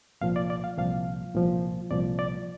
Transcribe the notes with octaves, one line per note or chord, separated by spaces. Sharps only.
C2 A#2 F3 F5
D5
D5
F5
C2 A#2 F3 F5
C2 A#2 F3
C2 A#2 F3 D5
D5